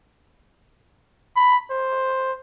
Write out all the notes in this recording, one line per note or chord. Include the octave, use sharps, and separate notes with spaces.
B5
C5